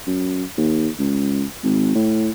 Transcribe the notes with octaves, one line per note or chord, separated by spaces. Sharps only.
F#2
D#2
C#2
G#1
A2